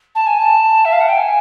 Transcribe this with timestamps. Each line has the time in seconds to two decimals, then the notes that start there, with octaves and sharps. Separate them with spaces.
0.15 A5
0.26 G#5
0.39 A5
0.85 E5
0.92 F5
1.00 F#5
1.08 G5
1.17 G#5